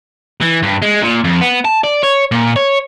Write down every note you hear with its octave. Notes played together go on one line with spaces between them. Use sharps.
E3
G2
G#3
A#2
F2
B3
A5
D5
C#5
A#2
C#5